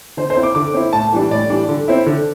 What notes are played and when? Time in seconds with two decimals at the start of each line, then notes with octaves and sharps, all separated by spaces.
0.17 D3 C5
0.30 C5
0.36 C4 E4
0.43 D6
0.55 D3 D6
0.74 C4 E4
0.93 A2 A5
1.13 E3 G3 D4
1.31 A2 D5
1.50 E3 G3 D4
1.69 D3
1.88 C4 E4
2.06 D3